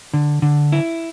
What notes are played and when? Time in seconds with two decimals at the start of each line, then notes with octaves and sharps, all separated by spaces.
0.14 D3
0.42 D3
0.72 E4